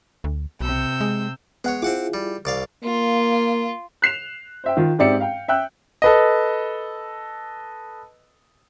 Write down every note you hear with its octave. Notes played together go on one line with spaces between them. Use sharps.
D2
B1 C3 E6 G6
G#3
G#3 B3 C#5 F#5
C4 E4 F4 G#4 F#5 D6
G3
C2 D5 F5
A#3 F4
F#6 C7 E7 F7
C5 E5 G5
D#3 F4
G#2 C4 G4 D5 E5 C#7
F5 G5
E5 G5 E6 F#6
A4 B4 D#5